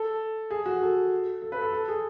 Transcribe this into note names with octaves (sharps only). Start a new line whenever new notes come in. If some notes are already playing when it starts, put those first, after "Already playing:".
Already playing: A4
G#4
F#4
A4
A4
B4
A4
A4
G#4